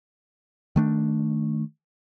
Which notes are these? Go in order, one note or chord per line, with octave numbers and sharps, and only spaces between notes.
D#3 A3 D4